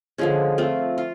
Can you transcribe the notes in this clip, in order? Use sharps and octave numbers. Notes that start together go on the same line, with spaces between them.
D3 F3 G#3 C#4
A3 C4 F4
F4